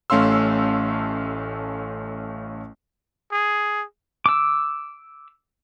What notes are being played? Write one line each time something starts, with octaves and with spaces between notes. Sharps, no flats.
A1 A3 C#4 F5 C6 E6
G#4
D6 E6